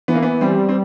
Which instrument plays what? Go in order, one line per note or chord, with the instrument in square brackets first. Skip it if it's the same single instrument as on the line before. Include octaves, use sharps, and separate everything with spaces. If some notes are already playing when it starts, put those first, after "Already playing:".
[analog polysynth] E3 [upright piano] B3
[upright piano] A#3
B3
[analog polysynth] G3 [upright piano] C4
[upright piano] C4